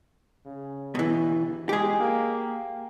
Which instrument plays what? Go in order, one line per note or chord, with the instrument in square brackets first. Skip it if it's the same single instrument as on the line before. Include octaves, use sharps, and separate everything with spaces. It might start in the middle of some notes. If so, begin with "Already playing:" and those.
[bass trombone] C#3
[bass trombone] G1 [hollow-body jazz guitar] B2 E3
[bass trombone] G#3 [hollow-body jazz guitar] G4 G#4
[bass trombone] A#3